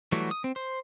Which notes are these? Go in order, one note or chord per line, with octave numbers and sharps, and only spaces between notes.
E3 F#3 G3 A3 F#4
D#6
C4
C5